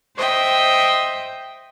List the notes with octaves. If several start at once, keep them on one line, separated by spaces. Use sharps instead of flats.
C5 D#5 E5 G5